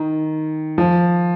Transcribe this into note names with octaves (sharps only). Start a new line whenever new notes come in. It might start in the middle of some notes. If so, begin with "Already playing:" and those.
Already playing: D#3
F3